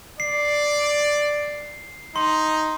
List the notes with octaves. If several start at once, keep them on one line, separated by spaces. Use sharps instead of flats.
D5 C7
D#4 C6